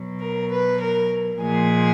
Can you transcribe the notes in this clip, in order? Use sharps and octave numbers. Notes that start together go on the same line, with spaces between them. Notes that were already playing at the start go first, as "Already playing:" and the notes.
Already playing: B2 F#3
A#4
B4
A#4
A#2 F3 G#3 G#4